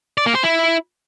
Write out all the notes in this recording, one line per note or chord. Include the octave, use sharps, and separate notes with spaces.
D5
A#3
C5
E4